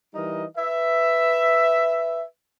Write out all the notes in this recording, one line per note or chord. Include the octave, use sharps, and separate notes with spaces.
E3 G3 D#4 A#4 D#5
B4 E5